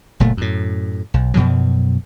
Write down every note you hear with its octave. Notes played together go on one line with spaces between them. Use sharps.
F#1 A#2 A3
F#2 A2
B1
F#2 B2 F3 F#3